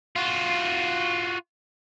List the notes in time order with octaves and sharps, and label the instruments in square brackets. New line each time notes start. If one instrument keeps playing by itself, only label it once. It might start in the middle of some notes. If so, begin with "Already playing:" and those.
[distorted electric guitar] F4 F#4